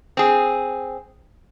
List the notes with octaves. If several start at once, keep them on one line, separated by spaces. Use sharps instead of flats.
C4 G#4